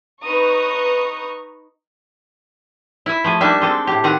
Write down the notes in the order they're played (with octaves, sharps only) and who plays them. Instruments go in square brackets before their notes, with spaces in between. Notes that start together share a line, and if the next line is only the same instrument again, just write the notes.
[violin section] D#4 B4 A#5 C#6 D#6
[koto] E4 E5
F3 A3 G#4
G3 A#3 D4 D#4 E5
G#3 C4 A4
A2 G4
D#3 C4 F#5 A#5